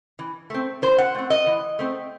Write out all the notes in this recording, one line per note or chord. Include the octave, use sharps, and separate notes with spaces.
E3
A3 C4
E3 C5
F#5
A3 C4
D#5
E3
A3 C4